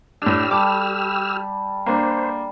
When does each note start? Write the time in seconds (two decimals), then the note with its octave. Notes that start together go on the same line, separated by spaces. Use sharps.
0.22 A2 D4 G4 E6 F6
0.51 G3 A4 D6
1.86 A#3 D4 C5